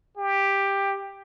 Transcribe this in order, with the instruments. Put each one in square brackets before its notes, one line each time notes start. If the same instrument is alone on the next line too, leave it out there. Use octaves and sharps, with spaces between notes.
[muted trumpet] G4